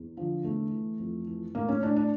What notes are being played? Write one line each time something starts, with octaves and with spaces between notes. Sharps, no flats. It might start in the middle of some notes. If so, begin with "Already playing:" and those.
Already playing: E2
D3 F3
E2 A3
E3
F2
E3
A2 A#3
C#4
A2 D4
D4